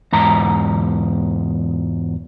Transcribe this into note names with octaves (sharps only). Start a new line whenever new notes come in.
E2 G#2 A#5